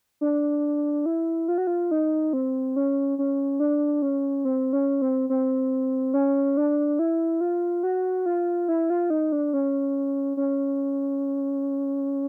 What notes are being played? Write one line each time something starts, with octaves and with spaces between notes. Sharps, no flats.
D4
E4
F4
F#4
F4
D#4
C4
C#4
C#4
D4
C#4
C4
C#4
C4
C4
C#4
D4
E4
F4
F#4
F4
E4
F4
D#4
D4
C#4
C#4